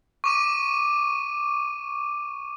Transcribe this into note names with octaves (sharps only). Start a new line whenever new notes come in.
C#6 D6 D#7